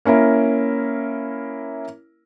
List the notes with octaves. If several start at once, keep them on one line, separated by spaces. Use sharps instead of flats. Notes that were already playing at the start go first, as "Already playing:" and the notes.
A#3 C#4 E4 A#4